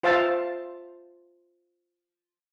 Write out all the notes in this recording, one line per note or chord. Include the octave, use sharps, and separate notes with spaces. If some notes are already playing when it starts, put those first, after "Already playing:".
F4 C5 E5 F5 A5